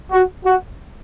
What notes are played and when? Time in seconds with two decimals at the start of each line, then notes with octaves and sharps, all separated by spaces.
0.12 F#4
0.45 F#4